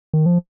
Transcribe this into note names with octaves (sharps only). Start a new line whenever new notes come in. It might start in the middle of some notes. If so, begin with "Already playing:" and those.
D#3
F3